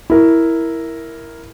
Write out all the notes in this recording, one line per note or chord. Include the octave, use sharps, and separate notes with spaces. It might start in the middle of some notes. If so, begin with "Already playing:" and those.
E4 A#4